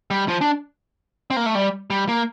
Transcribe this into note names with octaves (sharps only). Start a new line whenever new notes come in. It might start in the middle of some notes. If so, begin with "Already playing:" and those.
G3
F3
D4
C4
A#3
A3
G3
G3
A#3